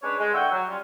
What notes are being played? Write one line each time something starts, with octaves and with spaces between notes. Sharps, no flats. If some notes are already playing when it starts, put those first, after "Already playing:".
G#3 C#4 D4 B4 C#5
G#3
D3 E4 F#5 G5 C#6 E6
F#3
G3 C#4 F4